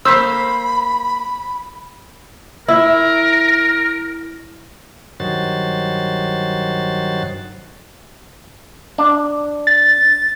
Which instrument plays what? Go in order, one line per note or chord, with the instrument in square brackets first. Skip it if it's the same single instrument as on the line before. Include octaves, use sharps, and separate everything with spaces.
[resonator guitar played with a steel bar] A#3 C5 [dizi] B5 [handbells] E6 G6 B6
[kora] E4 [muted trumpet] A#4
[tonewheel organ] G2 D#3 F#3 F#4 C5 A6
[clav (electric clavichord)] D4
[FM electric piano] A6